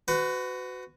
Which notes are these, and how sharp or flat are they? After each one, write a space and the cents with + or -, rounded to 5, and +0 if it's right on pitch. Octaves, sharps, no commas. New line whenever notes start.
F#4 +0 B4 +30